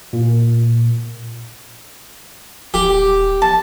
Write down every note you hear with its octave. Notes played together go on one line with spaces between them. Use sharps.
A#2
D#1 G4
A5